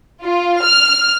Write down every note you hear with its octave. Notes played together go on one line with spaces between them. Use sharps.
F4
F6